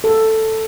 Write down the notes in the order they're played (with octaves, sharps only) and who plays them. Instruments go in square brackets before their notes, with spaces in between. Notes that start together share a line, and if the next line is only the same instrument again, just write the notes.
[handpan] A4